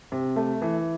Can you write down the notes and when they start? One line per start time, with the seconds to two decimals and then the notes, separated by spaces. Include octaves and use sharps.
0.12 C3
0.36 A3
0.62 E3